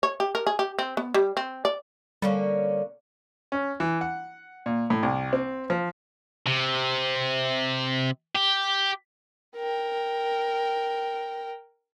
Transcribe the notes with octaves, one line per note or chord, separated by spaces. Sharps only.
C#5
G4
A#4
G#4
G4
C4
B3
G3
C4
D5
D3 G3 A#3 C#4
C#4
E3
F#5
A#2
A2
C2
C4
F3
C3
G4
A#4 G5